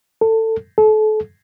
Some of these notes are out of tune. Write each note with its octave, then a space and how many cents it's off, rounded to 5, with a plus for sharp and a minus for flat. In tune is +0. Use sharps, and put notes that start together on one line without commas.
A4 +20
A4 -35